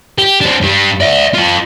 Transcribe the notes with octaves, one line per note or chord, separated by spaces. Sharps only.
G4
C4 D4
G2 G3
D5 E5
F4 A4